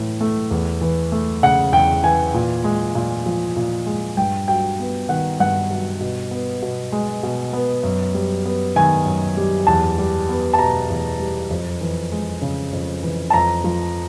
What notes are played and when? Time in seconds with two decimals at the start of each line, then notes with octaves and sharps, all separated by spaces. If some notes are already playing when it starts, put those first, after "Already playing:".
Already playing: A2 E3
0.21 A3
0.51 E2
0.81 E3
1.12 A3
1.43 C#3 F#5
1.72 E2 G5
2.03 E3 G#5
2.34 A#2
2.64 G#3
2.95 A#2
3.26 F3
3.56 A#2
3.86 G#3
4.17 G2 G5
4.48 F#3 G5
4.79 B3
5.09 D#3 F#5
5.40 G2 F#5
5.71 F#3
6.01 B2
6.31 B3
6.62 B2
6.92 G#3
7.23 B2
7.53 B3
7.83 F#2
8.15 G3
8.45 B3
8.76 D#3 G#5
9.06 F#2
9.37 G3
9.67 E2 A5
9.98 G3
10.29 B3
10.54 A5
10.59 B2 A#5
10.90 E2
11.20 G3
11.51 F2
11.81 E3
12.12 G#3
12.42 C#3
12.73 F2
13.03 E3
13.30 A5
13.33 F2 A#5
13.64 F3